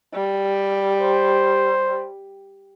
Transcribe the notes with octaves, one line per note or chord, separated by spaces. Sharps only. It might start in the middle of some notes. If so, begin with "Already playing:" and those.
G3
C5